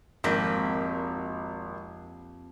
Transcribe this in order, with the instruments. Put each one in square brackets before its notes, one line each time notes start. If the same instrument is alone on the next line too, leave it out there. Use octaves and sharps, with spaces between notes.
[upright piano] G#1 [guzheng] F2 A#3 G4